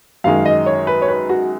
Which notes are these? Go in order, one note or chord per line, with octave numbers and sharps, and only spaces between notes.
F#2 D#3 G#3 F5
D#5
C#5
B4
C#5
B4
F#4